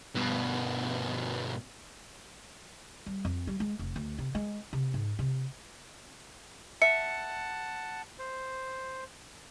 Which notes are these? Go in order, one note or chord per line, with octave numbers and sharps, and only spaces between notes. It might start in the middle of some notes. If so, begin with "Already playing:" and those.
G2 B2
G3
F2
G3
G#3
F1
D2
C3
G#3
C3
G#2
C3
E5 F#5 A5 C#7
C5